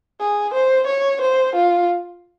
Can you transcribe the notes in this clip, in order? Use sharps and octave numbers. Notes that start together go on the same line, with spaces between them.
G#4
C5
C#5
C5
F4